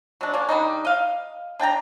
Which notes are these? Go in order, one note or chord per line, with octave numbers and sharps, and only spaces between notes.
F#3 G#3 D4
A#3 C#4 D4
D#3 G3 D4 D#4
D#5 F5
D4 G5 A5 A#5